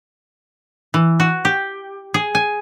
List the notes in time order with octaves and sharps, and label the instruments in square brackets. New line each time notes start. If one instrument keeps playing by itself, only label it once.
[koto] E3
F#4
G4
G#4
G#5